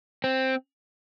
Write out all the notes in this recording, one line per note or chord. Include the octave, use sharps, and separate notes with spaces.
C4